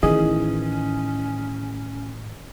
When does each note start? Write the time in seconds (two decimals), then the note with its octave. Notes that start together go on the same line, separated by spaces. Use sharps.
0.03 A1 A2 D#3 E3 C#4 G#4 D#5